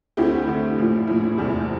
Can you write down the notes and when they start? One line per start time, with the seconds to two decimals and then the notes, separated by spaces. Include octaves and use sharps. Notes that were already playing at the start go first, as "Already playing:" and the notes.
0.17 D2 D3 A3 C4 E4 G4
0.47 D2 D3 A3 C4
0.78 A#1 A2 F3
1.07 A#1 A2 F3 E4
1.38 F1 E2 C3 G3